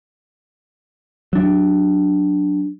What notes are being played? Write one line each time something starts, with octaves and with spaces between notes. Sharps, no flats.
F#3 D4